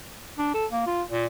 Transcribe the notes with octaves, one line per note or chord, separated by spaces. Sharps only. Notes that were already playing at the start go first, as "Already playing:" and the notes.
D4
A4
A#3
F4
A#2